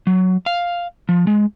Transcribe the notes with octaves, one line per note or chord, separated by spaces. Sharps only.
F#3
F5
F3
G#3